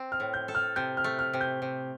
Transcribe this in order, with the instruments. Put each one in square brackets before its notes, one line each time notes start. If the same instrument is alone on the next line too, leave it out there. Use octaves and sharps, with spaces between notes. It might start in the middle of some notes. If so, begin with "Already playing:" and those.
Already playing: [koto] C4
[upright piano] F6
[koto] A2
[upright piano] G6
[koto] A4
[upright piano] F6
[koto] C3 [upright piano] G6
[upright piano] F6
[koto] A3
[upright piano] F6
[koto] C3
[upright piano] G6
[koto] C3